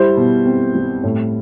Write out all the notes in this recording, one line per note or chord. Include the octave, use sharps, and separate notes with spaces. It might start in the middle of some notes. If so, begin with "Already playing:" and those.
Already playing: G3 E4 C5
B2
C4
G3
A2